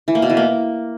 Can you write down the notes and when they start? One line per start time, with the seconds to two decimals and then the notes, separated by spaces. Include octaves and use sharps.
0.08 E3
0.15 A#3
0.22 B2
0.30 E3
0.37 A#3